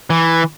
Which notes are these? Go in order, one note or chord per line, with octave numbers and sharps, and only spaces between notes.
E3